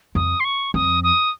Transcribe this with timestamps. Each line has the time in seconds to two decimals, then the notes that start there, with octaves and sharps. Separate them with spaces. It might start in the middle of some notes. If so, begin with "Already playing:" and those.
0.15 F2 D#6
0.40 C6
0.45 C#6
0.74 F2 D#6
1.04 D#6